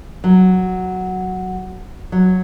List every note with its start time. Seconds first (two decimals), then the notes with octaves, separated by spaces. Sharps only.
0.24 F#3
2.12 F#3